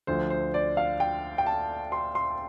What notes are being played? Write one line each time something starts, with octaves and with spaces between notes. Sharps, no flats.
D2 D3 F3 C5
C5
D5
F5
G5
G5
A5
C6
C6